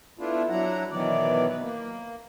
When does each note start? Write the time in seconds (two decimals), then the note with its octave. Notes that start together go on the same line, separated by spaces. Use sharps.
0.19 A3 B3 D4 E4 F4
0.49 F#3 D4 E4 F#5 A#5
0.91 B2 D#3 E3 F#3 B3 D5
1.49 B4
1.62 A#3